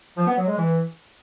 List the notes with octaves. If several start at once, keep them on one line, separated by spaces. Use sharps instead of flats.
F3
B3
F#3
G#3
E3